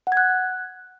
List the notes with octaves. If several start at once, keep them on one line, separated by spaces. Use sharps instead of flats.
F#5
G#6
F#6